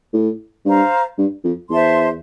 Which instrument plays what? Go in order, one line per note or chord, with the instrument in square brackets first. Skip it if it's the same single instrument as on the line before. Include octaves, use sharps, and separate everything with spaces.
[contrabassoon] A2
[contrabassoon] G2 [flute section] C5 F5 A#5
[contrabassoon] G2
F2
[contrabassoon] E2 [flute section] C5 E5 A5 C6